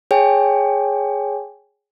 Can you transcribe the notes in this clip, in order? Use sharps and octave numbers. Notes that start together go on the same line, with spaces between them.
G#4 C#5 G5 G#5